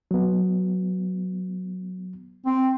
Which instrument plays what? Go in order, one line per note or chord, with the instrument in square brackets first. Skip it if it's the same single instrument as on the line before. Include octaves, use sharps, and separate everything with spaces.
[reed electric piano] F#3 B3
[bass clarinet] C4